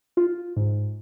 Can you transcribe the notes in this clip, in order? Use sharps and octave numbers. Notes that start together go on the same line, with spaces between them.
F4
G#2